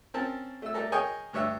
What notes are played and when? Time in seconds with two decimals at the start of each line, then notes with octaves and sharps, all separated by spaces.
0.14 C4 C#4 A#4 A5
0.62 A3 E6
0.74 G3 A3 A4 A#4
0.92 G#4 A#4 C#5 D#5 G5 G#5
1.33 D2 G2 C#5 E5